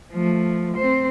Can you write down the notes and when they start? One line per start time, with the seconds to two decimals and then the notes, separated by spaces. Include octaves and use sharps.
0.13 F3 A3
0.78 C4 C5